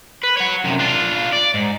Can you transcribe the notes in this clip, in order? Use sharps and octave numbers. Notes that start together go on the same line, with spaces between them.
B4
C#5 F#5
F#2 C3
D4 F4
D5
G#2